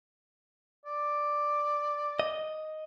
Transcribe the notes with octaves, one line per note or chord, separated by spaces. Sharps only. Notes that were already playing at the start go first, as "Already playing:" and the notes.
D5
D#5